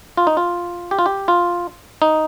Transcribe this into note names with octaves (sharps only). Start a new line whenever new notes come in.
F4
D#4
F4
G4
F4
G4
F4
D#4